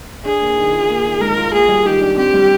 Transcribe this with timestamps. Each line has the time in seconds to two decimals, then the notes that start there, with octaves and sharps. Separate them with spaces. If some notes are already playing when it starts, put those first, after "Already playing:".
0.25 D4 G#4
0.41 A#3
0.57 D#3
0.73 F4
0.89 A#3
1.05 D#3
1.21 G#2 A#4
1.37 F4
1.53 A#3 G#4
1.69 G3
1.85 D#3 G4
2.01 D4
2.17 C4 G4
2.34 G3